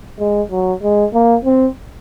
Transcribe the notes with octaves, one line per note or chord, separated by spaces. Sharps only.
G#3
F#3
G#3
A#3
C4